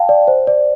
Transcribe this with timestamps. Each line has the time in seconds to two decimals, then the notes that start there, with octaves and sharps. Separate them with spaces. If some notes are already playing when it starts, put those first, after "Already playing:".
Already playing: F5 G5 A5
0.09 D5
0.28 C5
0.47 D5